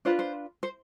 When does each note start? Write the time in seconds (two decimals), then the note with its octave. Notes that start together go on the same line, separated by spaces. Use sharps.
0.05 D4 F4 B4 C5
0.19 C5
0.63 C5